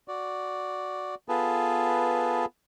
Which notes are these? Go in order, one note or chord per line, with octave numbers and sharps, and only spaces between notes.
F#4 D5
B3 F4 G#4 A4 B4